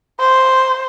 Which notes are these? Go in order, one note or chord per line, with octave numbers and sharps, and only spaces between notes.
C5